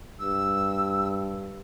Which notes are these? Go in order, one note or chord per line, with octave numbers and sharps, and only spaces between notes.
G2 E6